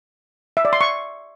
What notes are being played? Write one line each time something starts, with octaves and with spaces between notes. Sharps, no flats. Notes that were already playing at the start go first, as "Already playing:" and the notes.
E5
D5
C6
C#6